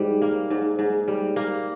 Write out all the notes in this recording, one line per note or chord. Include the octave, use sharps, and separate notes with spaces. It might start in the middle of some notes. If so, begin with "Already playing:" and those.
Already playing: G#2 G3
A#3
G#2
G#2
G3
A#3